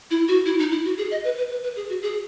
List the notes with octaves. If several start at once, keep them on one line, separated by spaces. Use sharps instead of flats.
E4
F#4
E4
D#4
E4
F#4
G#4
D#5
B4
B4
B4
B4
G#4
F#4
G#4